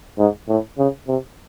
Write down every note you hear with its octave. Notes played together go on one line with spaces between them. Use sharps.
G#2
A2
C#3
C3